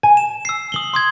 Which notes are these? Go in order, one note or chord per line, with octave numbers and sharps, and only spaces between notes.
G#5
E7
E6 C7
D#6 F#7 G7
C6 D#6 G#6